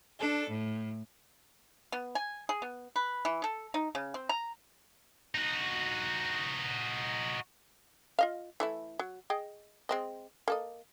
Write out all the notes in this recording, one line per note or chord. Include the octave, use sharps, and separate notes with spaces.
D4 A4
A2
B3
G#5
G#4
B3
B4
E3
A4
D#4
C#3
C4
A#5
D#4 F#4
F4 D#5 F5
E3 A3 E4
F#3
G#4 D#5 G5
G#3 C4 D#5
A#3 A4 D#5